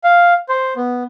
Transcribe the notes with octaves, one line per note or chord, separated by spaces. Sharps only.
F5
C5
B3